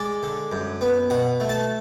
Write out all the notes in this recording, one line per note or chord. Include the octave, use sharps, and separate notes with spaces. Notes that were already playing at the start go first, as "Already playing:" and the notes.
Already playing: G#3 D5
D3
F#2
B3
B2 F#5
A3
A5